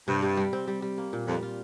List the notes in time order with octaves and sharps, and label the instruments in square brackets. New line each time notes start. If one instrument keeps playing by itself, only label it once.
[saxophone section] G2 [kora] C3
[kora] C3
G3
C4
G3
G3
A#3
A#2
[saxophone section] F2 [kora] G3
[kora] F4